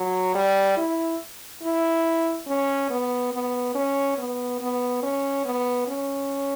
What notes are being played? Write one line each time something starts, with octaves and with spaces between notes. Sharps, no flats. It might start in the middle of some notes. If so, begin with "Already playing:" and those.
Already playing: F#3
G3
E4
E4
C#4
B3
B3
C#4
B3
B3
C#4
B3
C#4